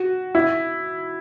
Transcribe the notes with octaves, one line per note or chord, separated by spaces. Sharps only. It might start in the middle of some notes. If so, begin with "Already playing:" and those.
Already playing: F#4
E4